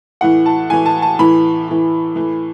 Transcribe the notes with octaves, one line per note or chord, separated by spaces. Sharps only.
A2 E3 F#5
A5
A2 E3 G#5
A5
A5
A2 E3 B5
A2 E3
A2 E3